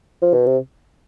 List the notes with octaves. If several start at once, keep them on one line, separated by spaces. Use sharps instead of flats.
F3
B2
C3